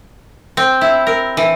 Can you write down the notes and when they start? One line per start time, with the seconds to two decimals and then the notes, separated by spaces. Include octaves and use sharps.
0.57 C4
0.81 E4
1.07 A#4
1.37 E3